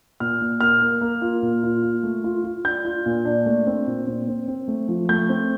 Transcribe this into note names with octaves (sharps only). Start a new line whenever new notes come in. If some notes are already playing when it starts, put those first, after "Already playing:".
A#2 F6
A#2
A#3 F6
A#3
A#3
F4
A#2
F4
F4
A3
F4
F4
D4 G6
F4
A#2
D4
A3
C4
A#2
C4
C4
C4
A3
F3
A3 G6
C4